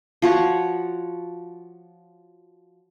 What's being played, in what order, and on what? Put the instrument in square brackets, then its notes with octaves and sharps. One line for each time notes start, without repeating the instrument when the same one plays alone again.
[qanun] F3 F#4 C#5